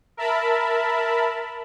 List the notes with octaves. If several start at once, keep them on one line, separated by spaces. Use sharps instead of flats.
A#4 E5 A5 B5